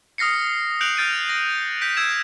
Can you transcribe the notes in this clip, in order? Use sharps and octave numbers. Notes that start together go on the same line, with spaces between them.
D#6 F6 A#6 C7 C#7
F#6 G6 C#7 D7 F7 F#7
F6 G6 A6 D7 D#7
A#6
G6 B6 D7
E6 G#6 D7 E7